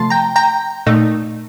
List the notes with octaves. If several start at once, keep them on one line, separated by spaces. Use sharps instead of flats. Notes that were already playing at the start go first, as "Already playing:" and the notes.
Already playing: C3 F3 A3 A5 C6
G5 A#5
G5 A#5
A#2 A3 D#4